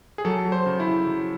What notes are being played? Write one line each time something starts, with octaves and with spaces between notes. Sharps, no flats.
G#4
F#3 A4
F#3
C5
C#3
E4
C#3
F#3